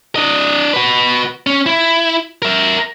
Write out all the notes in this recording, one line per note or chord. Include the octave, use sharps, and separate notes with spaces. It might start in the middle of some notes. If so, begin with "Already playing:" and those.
D4 D#5
F#4 B4
C#4
E4
A#4 E5